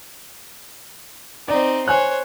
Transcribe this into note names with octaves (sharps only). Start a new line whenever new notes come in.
C4 D#4 D5
C5 C#5 G#5 F#6